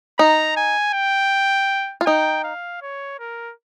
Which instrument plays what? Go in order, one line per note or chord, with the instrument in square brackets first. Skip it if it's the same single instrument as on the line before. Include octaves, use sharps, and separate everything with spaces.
[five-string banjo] D#4 [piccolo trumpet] A#5
[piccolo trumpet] G#5
G5
[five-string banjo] F4
[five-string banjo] D#4 [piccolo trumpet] G5
[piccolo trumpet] F5
C#5
A#4